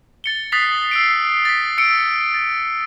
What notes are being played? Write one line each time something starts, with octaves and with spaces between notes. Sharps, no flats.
A6 C#7 G7
D#6 F#6 A6 B6 C7 F7
E6 C7 D7
A6 B6
E6 C#7 D7
A6